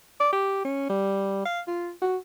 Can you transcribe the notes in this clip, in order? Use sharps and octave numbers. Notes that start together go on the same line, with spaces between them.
D5
G4
C#4
G3
F5
F4
F#4